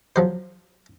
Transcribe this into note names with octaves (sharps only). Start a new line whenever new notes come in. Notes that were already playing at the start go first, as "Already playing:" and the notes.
F3 F#3 C5